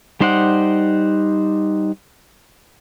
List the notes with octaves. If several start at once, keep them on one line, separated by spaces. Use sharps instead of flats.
G3 D#4 C5 D5 F#5